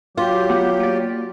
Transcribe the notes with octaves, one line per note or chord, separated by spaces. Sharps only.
F#3 F4 G4
A3 B3 F#5
A#3 D5